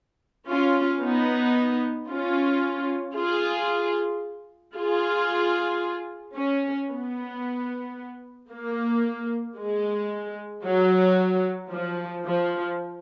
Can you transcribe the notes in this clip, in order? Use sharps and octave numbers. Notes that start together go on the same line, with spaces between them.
C#4 F4
B3 D#4
C#4 F4
F4 G#4
F4 G#4
C#4
B3
A#3
G#3
F#3
F3
F3